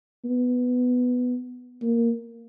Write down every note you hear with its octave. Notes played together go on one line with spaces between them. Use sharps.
B3
A#3